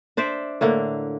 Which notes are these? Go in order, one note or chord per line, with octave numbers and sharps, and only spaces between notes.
D4 C5 D5 E5
A2 D3 A#3